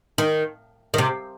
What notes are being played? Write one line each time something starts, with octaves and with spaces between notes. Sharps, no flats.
D#3
D#3
C3